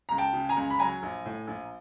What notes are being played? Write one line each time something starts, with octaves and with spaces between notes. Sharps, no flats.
C#2 A#5
G5 A5
C#3
G#5 A#5
C#2
B5
F#3 G#5 A#5
A#1
A2
A#1